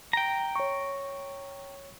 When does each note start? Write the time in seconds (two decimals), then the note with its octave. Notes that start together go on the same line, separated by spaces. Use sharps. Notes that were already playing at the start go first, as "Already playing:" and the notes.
0.13 G5 A#5
0.56 C#5 C#6